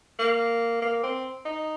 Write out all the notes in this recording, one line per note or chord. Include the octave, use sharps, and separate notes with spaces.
A#3
A#3
C4
D#4